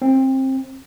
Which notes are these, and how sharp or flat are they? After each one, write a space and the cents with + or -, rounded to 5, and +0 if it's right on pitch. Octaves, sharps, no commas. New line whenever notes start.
C4 +20